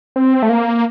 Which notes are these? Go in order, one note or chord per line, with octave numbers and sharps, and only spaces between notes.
C4
A3
A#3